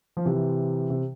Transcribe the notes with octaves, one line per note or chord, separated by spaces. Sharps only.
F3
C3 E3
C3